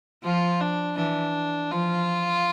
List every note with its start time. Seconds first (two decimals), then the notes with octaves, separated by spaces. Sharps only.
0.23 F3 F4
0.60 D4
0.97 E3 D4
1.71 F3 F4